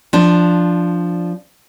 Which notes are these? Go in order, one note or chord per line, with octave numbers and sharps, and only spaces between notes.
F3 D4